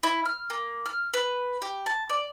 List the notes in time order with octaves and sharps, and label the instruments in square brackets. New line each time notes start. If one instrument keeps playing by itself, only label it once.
[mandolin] E4
F6
A#3
F6
B4
G4
A5
D5